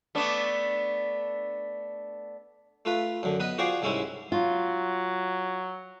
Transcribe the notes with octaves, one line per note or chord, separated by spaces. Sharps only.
A3 B3 D4
A3 F4 B4
F#2 D3
B3 B4 D#5
F4 F#4 G#4 C5 D5 G5
C2 G#2 G#3 C4 C#4 E4
F#3 F4